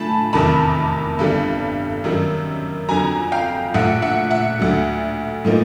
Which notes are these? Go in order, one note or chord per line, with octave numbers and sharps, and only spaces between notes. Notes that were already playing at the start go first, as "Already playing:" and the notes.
Already playing: A2 G#5 A5 B5
F1 E2 C3 D#3 A5 B5
G1 G2 D3 G3
F#2 D#3 G3
F2 D3 F#3 G#5 A#5
F5 G5
A#1 A2 F3 E5 F#5
E5 F#5
E5 F#5
D2 D3 F#3
A2 F3 A#3 D#4